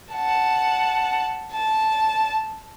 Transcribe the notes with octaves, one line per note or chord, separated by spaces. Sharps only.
F#5 A5
A5